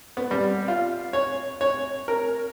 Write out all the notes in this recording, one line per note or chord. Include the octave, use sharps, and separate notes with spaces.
B3
G3
F4
C#5
C#5
A#4